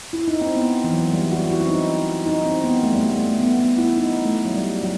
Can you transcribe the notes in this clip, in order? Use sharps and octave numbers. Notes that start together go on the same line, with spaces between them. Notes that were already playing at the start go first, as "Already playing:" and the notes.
E4
D#4
C4
B3
E3
F#3
E3
G3
F#4
F#4
E4
C4
D#4
D#4
C4
B3
A3
G3
A3
A3
A3
B3
B3
E4
D#4
A3
F#3
G3
F#3